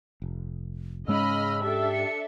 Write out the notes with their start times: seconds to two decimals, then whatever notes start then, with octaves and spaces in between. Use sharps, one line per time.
0.22 F1
1.08 G#2 C#3 G#3 C#4 D#5 B5 E6 F6
1.63 D4 G4 A4 E5
1.92 C#7